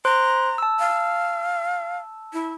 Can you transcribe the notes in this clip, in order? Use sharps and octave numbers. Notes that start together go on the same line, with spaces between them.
C5 A#5 C6 F#6
A5 E6
F5
E4